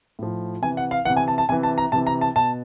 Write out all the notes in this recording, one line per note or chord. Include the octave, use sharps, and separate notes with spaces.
A2 F3
C3 E3 G#5
F#5
F5
C3 E3 F#5
G#5
A5
A5
C3 E3 G#5
A5
A#5
C3 E3 A5
A#5
A5
B2 A5